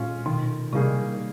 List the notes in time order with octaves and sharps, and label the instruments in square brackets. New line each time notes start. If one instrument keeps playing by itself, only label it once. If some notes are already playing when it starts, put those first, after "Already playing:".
Already playing: [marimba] A#2 [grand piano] G#3 C#4 F4
[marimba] B2 [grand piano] D#3
[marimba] C3 [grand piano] G3 A#3 D#4 G#4